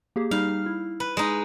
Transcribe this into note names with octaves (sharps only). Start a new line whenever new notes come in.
A#3 G4 G#4
G3 D#4 F5 F6
E4
B4
G#3 D#4